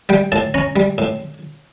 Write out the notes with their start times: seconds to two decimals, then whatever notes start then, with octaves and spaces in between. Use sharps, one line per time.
0.09 G3 G5
0.32 A2 A5
0.54 C#4 A#5
0.76 G3
0.98 A2